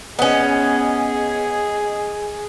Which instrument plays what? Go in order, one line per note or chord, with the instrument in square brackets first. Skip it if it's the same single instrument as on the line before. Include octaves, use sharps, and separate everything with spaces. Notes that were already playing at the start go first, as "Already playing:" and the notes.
[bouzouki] B3 C#4 [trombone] G#4 [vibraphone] D#5